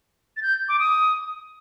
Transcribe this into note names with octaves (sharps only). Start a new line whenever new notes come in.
A6
G6
D6
D#6